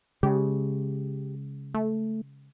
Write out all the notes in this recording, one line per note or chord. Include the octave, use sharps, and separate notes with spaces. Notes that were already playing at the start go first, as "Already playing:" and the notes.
C#3 G#3 G4
A3